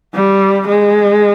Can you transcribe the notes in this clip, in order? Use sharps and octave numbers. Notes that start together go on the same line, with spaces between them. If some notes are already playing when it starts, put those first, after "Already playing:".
G3
G#3